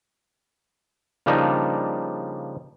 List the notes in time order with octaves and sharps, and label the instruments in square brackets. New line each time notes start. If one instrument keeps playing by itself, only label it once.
[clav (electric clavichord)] C#3 F3 G3 A#3 D4 D#4